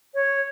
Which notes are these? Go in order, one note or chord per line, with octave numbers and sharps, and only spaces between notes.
C#5